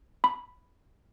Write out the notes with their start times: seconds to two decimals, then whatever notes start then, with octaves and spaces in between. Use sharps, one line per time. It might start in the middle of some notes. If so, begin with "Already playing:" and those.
0.24 B5